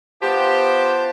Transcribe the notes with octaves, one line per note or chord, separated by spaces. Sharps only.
B3 F4 G4 C5 A5